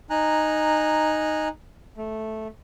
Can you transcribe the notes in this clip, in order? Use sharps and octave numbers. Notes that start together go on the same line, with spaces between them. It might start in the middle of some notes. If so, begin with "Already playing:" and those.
D#4 G#5 A#5 F#6
A3